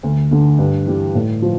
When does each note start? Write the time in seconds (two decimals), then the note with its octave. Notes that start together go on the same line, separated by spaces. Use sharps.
0.03 D2
0.31 D3 A3
0.59 G2
0.86 E3 G3
1.15 A2
1.42 F3